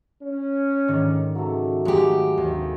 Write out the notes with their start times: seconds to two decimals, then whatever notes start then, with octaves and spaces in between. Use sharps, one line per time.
0.21 C#4
0.88 G#2 D#3 D5
1.35 C#3 F#3 A3
1.85 F#3 G#3 A3 F#4 G4
2.38 D#2 C3